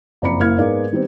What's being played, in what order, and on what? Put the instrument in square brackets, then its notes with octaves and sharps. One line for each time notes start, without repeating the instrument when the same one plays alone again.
[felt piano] F#1 F2 D5 A#5 B5 C#7
F#1 A#3 E4 F6 G#6
G#2 G#3 B3 A#4 D5 F5
D#3 G3 B3 C4